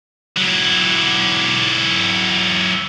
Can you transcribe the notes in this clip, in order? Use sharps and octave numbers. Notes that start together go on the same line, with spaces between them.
F#3 E4